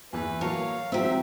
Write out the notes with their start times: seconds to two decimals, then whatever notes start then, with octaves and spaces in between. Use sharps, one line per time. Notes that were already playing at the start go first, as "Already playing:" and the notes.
0.13 E2 E3 B4
0.41 F#3 A#3 C#5 F5 A5
0.92 G#2 E3 F#3 C4 G4 E5